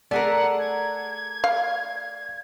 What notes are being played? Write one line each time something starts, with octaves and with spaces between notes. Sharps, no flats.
A3 G#4 A#4 D5 F#5
G#6
F5